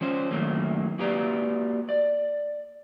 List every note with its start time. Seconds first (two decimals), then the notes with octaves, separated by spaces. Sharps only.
0.01 F3 C#4 C5
0.31 F#2 B2 D#3 F#3 A3 A#3
0.99 A#3 F#4 G4 B4 D5 A#5
1.89 D5